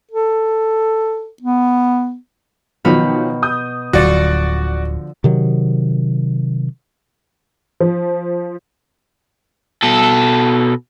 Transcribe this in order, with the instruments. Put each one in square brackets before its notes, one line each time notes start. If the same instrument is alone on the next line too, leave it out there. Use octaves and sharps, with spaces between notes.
[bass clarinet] A4
B3
[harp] B2 B5 F6 [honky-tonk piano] D#3 F3 F#3
[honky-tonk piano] D#6 G6
[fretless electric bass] D1 [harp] D3 F3 F4 [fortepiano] F#4 D5
[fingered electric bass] C3 D#3 F#3
[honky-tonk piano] F3
[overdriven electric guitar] B2 A4